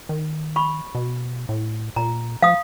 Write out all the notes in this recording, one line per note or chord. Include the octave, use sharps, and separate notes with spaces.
D#3
B5 C#6
B2
A2
A#2 A#5
F3 F5 D#6